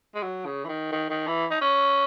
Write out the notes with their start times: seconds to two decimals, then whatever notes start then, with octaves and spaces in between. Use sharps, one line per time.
0.15 G#3
0.23 F#3
0.46 C#3
0.65 E3
0.69 D#3
0.92 D#3
1.10 D#3
1.27 E3
1.51 D#4
1.61 C#4